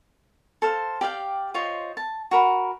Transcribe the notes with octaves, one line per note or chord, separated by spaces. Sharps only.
A4 C5 F5
G4 D5 F5 G5
F4 C5 C#5 D#5
A5
F#4 A#4 B5